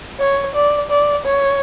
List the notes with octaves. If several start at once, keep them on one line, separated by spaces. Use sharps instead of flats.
C#5
D5
D5
C#5